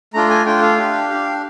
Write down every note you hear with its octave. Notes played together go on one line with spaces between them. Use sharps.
A3 D4 F4 A#5
G#5
A3 D4 F4 G5
F5
D4 G4
D4 G4